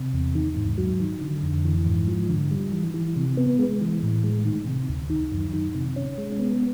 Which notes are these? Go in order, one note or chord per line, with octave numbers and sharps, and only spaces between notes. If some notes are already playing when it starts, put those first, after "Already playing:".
Already playing: C3
E2
D#3
G#2
F#3
D#3
D3
F2
E3
G#2
F3
D3
G3
E3
E3
C3
B3
G#3
E3
A2
G#3
D#3
C3
D2
D#3
F#2
D#3
C3
C#4
G#3
B3